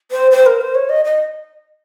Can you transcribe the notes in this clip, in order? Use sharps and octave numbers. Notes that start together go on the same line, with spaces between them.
C5
C5
A#4
C5
C#5
D#5
D#5